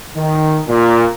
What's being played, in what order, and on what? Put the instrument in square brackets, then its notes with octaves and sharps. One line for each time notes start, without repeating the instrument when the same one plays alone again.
[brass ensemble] D#3
A#2